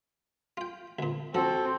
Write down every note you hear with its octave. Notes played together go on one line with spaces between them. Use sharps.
F4 G5
D2 A#2
F3 C4 F#4 A4